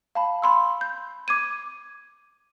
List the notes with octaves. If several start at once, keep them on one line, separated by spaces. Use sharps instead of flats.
F5 A5 B5
B5 C6 E6
G6
D6 G#6 D#7